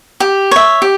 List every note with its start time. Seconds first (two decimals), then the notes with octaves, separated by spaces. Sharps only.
0.20 G4
0.51 C#5 E5
0.82 G4